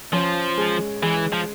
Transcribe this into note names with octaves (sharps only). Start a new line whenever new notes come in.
F3 C#4
G#3
E3 G#3
F3